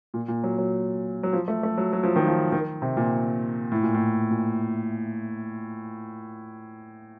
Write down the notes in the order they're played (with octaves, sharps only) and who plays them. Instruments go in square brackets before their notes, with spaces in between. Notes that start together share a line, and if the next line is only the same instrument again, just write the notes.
[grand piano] A#2
A#2
F#3
F#3
F#3
F3
A3
A3
F#3
F#3
F3
D#3
F3
D#3
C3
A#2
A2
A#2
A2
A#2